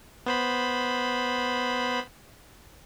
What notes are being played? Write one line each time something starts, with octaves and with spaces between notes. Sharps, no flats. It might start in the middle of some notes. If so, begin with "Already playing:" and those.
B3 C5 B5